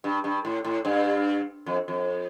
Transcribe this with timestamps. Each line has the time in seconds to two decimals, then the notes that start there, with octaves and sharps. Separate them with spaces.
0.04 G2
0.24 G2
0.45 A2
0.64 A2
0.85 G2
1.66 F2
1.88 F2